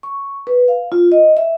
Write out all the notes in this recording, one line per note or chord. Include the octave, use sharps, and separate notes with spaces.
C#6
B4
F5
F4
D#5
E5